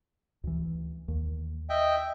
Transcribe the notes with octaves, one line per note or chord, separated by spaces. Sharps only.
D2 E3
D#2
D#5 E5 G5